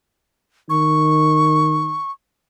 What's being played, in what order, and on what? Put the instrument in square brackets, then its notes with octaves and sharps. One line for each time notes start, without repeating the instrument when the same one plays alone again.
[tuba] D#3 [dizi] C#6